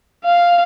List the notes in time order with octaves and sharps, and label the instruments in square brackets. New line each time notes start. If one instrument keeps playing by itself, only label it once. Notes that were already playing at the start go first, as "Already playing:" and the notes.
[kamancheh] F5